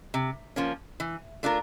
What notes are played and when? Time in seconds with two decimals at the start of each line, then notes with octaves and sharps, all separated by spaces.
0.14 C3
0.56 F3 A#3 C#4
1.00 E3
1.43 A3 D4 F4 A#4